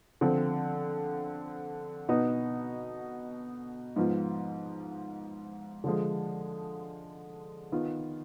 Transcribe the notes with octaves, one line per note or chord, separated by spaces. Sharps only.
D3 F3 C4
B2 B3 D#4
G#2 F3 B3 F4
D3 F3 G#3
D#3 B3 F4